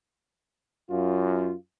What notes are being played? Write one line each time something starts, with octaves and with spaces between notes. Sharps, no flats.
F#2 F4